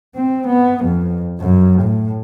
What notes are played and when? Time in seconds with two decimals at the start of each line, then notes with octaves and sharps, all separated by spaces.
0.15 C4
0.47 B3
0.85 F2
1.40 F#2
1.82 A2